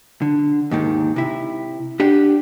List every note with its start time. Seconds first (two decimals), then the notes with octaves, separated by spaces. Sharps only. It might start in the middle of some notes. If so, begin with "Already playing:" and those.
0.22 D3
0.71 D#2 G#2 D#3
1.16 C3 E4
2.00 D4 G4 F#5